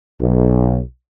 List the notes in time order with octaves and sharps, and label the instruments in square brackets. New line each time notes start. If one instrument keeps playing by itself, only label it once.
[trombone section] B1